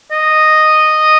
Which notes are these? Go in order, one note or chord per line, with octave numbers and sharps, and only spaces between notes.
D#5